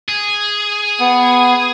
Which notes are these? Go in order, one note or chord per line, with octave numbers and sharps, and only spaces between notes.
G#4
B3